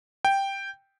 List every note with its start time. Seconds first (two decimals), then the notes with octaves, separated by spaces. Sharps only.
0.25 G5